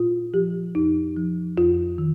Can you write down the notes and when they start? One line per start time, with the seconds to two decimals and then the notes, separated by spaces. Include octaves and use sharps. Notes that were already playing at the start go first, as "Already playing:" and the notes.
Already playing: A#2 F4
0.34 F3 G4
0.75 F2 D#4
1.16 F3
1.57 F2 F4
1.98 D#3